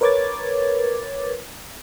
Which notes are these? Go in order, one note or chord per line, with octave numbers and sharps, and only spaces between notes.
A#4 B4 C#5 D6 G#6 A6